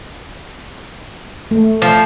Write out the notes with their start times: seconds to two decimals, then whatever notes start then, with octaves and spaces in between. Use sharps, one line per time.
1.51 A3
1.82 F3